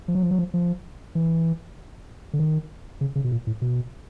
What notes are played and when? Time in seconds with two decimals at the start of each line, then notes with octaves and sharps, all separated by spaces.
0.08 F3
0.15 F#3
0.22 F3
0.31 F#3
0.39 F3
0.54 F3
1.15 E3
2.33 D3
2.39 D#3
3.01 C#3
3.15 C#3
3.24 B2
3.31 A#2
3.47 A2
3.62 B2